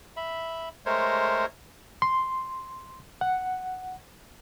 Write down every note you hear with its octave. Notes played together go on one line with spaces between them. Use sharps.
E5 B5
G#3 A3 A#4 C5 C#5
C6
F#5